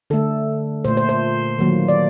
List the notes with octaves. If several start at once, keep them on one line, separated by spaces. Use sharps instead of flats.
D3 A3 A4
A#2 A3 C5
C5
C5
D#3 F#3 A#3
D5